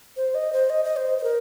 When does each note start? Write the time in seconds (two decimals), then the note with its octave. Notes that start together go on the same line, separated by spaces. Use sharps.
0.17 C5
0.35 D#5
0.53 C5
0.70 D#5
0.84 D#5
0.97 C5
1.19 C5
1.24 A#4